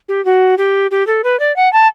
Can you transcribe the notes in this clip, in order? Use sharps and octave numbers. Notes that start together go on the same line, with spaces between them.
G4
F#4
G4
G4
A4
B4
D5
F#5
A5